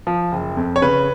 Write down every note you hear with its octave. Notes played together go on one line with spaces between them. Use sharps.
F3
F#1
F2
C#5
C#3 B4